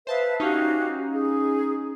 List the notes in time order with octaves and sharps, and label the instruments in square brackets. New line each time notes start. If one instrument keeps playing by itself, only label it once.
[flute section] B4 E5 F5 [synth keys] C5 A5 D#6
[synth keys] C#4 D#4 [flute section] F#4 G4 F5
[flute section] G#4